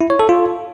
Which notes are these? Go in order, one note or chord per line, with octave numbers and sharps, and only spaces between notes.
E4
C#5
A4
F4